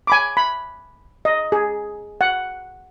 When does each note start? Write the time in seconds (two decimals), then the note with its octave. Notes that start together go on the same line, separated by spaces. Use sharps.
0.07 G#5 B5 D6
0.37 B5
1.25 D#5
1.52 G#4
2.21 F#5